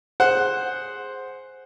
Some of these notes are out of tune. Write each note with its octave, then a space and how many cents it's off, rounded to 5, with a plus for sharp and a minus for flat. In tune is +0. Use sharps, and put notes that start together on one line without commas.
G#4 +0 C5 +0 F#5 +0